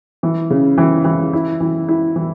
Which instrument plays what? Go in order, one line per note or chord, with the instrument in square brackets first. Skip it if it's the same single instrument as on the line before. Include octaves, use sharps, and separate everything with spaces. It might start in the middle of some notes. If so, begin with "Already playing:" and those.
[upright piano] E3
C#3
E3
E3
E4
E3
E4
E3